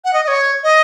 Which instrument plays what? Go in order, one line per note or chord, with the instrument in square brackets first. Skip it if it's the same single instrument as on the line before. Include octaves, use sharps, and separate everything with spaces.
[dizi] F#5
D#5
D#5
C#5
D#5